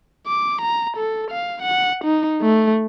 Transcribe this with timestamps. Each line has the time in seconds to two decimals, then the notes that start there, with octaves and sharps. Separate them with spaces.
0.27 D6
0.62 A#5
0.97 A4
1.31 F5
1.62 F#5
2.04 D#4
2.42 A3